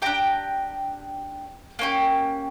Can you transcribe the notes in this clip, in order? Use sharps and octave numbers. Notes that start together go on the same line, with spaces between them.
D4 G4 G5 A#5
A#3 C#4 G4